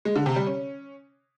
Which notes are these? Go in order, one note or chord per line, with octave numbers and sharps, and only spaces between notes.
G#3
D3
C3
G3
C#4